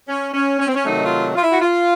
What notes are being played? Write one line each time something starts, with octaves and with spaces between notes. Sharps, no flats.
C#4
C#4
C#4
C4
C#4
C3 D#3 F#3 A3 D#4
F4
F4
E4
F#4
F4